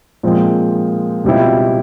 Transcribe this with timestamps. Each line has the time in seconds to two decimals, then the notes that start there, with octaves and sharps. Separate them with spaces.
0.23 A#2 F3 G#3 C4
1.24 C#2 B2 G3 C4 E4